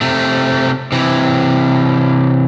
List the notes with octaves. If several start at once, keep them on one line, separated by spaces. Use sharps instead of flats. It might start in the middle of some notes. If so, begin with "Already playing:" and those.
C3 A3
C3 E3